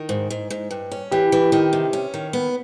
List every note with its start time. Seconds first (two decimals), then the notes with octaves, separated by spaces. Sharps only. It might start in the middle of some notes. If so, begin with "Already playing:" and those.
Already playing: D#3
0.09 G#2
0.30 G#2
0.50 G#2
0.71 G2
0.92 C#4
1.11 E3 G4
1.32 E3
1.52 D#3
1.73 C3
1.93 C#4
2.14 D#3
2.33 B3